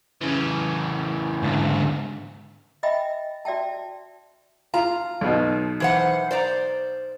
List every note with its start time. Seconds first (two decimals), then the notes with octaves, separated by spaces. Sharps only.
0.21 C#3 E3
1.43 G#2 D3
2.83 D#5 E5 G5 G#5 B5
3.45 F#4 D5 E5 G5 A5
4.74 F4 A#5
5.21 B1 B2
5.80 E3 C5 F#5
6.31 C5 D5 A#5